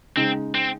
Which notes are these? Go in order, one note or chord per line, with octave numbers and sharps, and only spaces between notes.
C#3 G#3 C4 D#4
C4